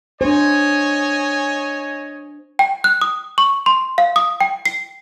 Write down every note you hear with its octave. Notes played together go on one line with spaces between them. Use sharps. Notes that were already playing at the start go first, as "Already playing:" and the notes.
D4 C5 C#5 D#5 G#5
G5
F#6
D#6
C#6
C6
F5
D#6
G5
C7